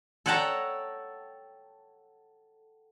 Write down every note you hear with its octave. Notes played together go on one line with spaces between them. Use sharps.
A4 C#5 F#5 G5 A5 A#5